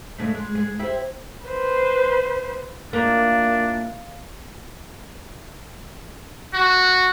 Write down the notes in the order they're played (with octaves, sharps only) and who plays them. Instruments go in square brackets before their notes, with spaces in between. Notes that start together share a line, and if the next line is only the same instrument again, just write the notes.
[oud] C#3 G#3 A3
G#3
G#3
E4 G4 C5
[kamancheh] B4 C5
[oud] A#3 [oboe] D4 [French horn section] E4 F4 A#4
[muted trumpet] F#4